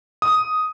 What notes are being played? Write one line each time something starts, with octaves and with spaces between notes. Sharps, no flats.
D#6